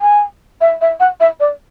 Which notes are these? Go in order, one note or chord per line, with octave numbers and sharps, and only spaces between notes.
G#5
E5
E5
F#5
E5
D5